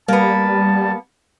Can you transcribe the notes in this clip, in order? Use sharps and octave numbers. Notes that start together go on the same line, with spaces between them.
G3 A#3 B3 A5